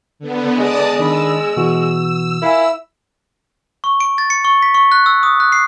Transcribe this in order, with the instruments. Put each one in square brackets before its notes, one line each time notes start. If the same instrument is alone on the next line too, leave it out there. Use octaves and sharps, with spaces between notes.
[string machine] D3 B3
[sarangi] G#3 [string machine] D5 A5 D#6
[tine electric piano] D#3 D4 B5 [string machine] E6
[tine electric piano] B2 E3 F#4
[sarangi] E4 [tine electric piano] A#4 F5 G#5 [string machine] E6
[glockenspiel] C#6
D7
A6
C#7
C#6
B6
C#6
F#6
E6
D#6
F#6
C7